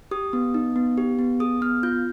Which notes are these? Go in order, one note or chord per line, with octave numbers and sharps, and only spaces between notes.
G4 D#6
B3
D#4
B3
G4
B3
G#4 D#6
B3 F6
F4 G6